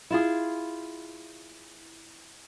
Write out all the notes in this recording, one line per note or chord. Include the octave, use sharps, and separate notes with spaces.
E4 F4 G#4